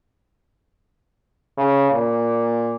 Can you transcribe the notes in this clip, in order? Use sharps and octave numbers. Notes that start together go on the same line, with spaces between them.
C#3
A#2